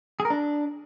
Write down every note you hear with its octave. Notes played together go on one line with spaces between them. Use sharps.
G#4
A#4
D4